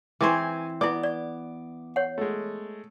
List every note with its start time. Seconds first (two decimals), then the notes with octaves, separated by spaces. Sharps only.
0.21 E3 C4 C5 G#5 C#6 D6
0.81 B3 E4 D5 D6
1.03 D5
1.96 C#5 F#5
2.18 G#3 A3